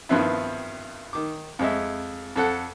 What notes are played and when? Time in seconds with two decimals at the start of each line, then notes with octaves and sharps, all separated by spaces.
0.09 G2 D#3 F3 B3 C4 E4
1.13 D#3 D6
1.59 F2 G#3 E5
2.36 F2 A4 F#5